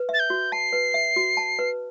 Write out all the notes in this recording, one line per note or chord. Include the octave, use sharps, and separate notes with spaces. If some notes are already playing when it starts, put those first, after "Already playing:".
Already playing: B4
E5 A6
G6
F#4
A5 C7
B4
E5
F#4
A5
B4